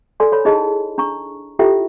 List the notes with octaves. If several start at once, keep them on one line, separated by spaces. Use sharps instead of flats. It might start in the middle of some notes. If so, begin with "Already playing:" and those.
A4 D5 G#5 C6
A4 C#5 B5
D#4 E4 G#4 D#5 A5
D4 A#5 C#6
E4 F4 G4 A4 E5 G5